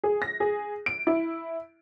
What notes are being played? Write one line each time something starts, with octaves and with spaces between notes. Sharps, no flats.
G#4
A#6
G#4
D7
E4